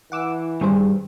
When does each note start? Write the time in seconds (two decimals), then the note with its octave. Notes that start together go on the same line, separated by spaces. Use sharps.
0.12 E3 F#5 D6 E6
0.61 G2 D#3 G#4 C5